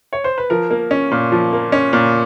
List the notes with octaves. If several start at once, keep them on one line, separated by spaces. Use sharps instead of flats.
C#5
C5
B4
F3 A#4
A#3
C#4
A#2
F3
A#3
C#4
A#2